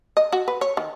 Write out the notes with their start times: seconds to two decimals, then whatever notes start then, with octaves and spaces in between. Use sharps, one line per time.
0.17 D#5
0.32 F#4
0.48 B4
0.61 C#5
0.77 D#3